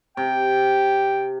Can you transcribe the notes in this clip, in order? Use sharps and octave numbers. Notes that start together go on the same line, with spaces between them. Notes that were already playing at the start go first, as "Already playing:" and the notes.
C3 G5